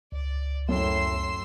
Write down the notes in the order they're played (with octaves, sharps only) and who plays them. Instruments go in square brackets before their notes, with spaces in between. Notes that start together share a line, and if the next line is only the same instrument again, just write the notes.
[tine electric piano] C#2 [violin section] D5
[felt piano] F#2 [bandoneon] A2 [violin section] C6 E6 C7